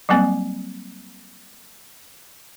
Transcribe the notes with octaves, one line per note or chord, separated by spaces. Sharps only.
F#3 G3 A#3 C4